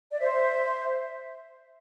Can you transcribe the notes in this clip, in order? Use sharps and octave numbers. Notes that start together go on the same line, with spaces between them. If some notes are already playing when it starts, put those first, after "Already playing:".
D5
C5 E5